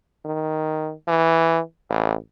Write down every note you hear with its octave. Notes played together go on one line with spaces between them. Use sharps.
D#3
E3
A1